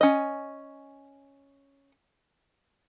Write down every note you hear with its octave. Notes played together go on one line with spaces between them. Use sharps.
C#4 D#5